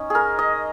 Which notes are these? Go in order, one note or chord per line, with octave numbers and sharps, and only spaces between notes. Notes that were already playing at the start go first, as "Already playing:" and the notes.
Already playing: C#4 D#4
G#4 A#4
D#5